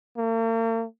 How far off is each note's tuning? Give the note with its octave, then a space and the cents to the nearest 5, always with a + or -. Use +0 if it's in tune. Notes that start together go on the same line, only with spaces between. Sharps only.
A#3 -45